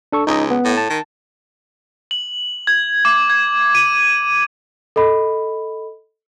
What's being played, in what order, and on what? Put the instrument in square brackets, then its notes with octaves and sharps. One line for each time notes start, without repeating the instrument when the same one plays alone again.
[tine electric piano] D4 A4 C#6
[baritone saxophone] C#2 [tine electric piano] D#4 D#5
[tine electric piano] B3
[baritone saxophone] A2
[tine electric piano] A5
[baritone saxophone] D#3
[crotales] F#7
G#6
D6
G#6
D#7
[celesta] A4 D#5 B5